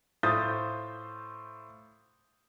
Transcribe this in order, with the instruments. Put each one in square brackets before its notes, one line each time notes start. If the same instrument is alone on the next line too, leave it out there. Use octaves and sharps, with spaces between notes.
[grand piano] A2 F4 C5 D#6 G6 A6